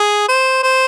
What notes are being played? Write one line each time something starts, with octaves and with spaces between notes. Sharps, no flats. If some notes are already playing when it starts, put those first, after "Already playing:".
Already playing: G#4
C5
C5